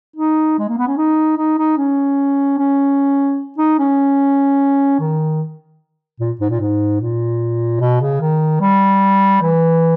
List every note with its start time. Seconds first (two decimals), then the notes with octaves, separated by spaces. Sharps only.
0.16 D#4
0.58 G#3
0.69 A#3
0.78 B3
0.87 C#4
0.97 D#4
1.37 D#4
1.58 D#4
1.77 C#4
2.58 C#4
3.58 D#4
3.79 C#4
5.00 D#3
6.20 A#2
6.41 G#2
6.50 A#2
6.60 G#2
7.01 A#2
7.80 B2
8.01 C#3
8.21 D#3
8.61 G3
9.42 E3